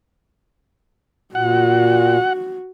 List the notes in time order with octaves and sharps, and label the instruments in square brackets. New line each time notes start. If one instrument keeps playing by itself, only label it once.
[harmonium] A#2 [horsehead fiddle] F#4 [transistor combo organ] F#5